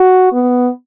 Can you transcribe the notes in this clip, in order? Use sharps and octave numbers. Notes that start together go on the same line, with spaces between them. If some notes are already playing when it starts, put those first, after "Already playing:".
Already playing: F#4
B3